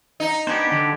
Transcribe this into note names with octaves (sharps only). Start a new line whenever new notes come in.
D#4
B3 D4 G4 C5 F#5 G#5
D3